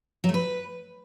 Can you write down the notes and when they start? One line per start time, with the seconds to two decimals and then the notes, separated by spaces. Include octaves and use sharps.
0.24 F#3
0.29 A3
0.34 B4